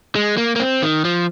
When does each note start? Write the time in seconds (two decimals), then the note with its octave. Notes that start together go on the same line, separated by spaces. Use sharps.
0.16 G#3
0.37 A#3
0.56 A#3
0.60 C4
0.82 D#3
1.05 F3